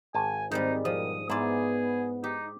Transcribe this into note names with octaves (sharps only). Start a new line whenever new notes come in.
G#1 G#5 A5
G#2 D#3 G3 C4 D#4
B2 F3 G3 A#4 D#6
G#2 B3 E4 G#4 D5
D#4 G4